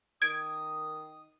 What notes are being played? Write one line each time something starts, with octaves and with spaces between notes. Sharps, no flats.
D#3 D#6 G#6 D7